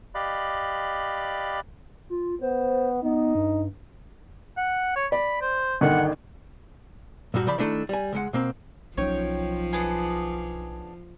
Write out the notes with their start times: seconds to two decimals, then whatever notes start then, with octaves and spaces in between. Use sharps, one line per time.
0.15 G4 D5 D#5 F5 B5 F#6
2.10 F4
2.41 B3 C5
3.03 B3 D#4
3.35 G2
4.57 F#5
4.96 C#5
5.12 D5 B5
5.41 C5
5.81 G1 D3 D#3 F#5
7.34 G2 A#2 G3 F#4
7.47 C#3 F3 D5 B5
7.59 D#3 F3 A3 D4 E4
7.89 G3 G#5
8.13 C#2 G#3 F#5
8.33 B2 A#3 C4
8.97 B1 F3 F#3 C#4 D#4 C#5 G5
9.73 B3 D4 G#4